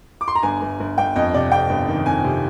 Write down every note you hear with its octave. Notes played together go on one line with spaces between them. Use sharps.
D6
C6
A#5
G1 G#5
G1
G1
G1 G5
F2 D#5
C3 D5
F2 G5
G1
D#3
F2 G#5
C3